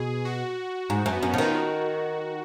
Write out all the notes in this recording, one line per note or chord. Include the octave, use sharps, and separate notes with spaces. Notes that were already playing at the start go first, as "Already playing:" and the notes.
Already playing: B2 G#4
F#4
G#2
F#2
B3
F#2 C#4
D#3 F3 D#4
F4
F#4